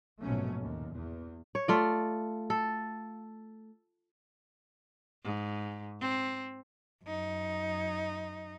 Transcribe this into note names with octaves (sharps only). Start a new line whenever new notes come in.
A#1 G#2 B2 F#3 A3 C#4
D#2 A#2
E2
C#5
A3 F4 D5
A4
G#2
C4
F#2 D#4